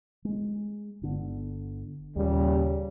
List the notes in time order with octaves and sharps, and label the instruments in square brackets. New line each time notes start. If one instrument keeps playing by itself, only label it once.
[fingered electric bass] G#3
G1 D3 B3
[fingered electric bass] D#2 [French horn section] A#2 C#3 G3